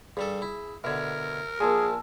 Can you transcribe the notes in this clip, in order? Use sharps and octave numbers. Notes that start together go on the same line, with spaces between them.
G2 G3 G#4 A4
E4
B2 D3 A#4 E5 G#6
A#1 A#2 G#4 G#5 A5 E6